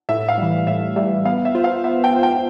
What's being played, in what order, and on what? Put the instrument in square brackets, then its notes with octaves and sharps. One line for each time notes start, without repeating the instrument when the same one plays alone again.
[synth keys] A2 [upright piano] E5
[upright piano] F5
[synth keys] E3 G3
[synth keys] A2 [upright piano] E5
[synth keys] E3 G3 [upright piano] E5
[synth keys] B3 [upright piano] F5
[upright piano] E5
[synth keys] F4 C5
[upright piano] F5
[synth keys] B3 [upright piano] E5
[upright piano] G5
[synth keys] F4 C5
[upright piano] G5